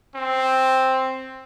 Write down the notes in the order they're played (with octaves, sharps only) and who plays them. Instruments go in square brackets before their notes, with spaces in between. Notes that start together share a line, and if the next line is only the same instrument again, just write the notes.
[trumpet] C4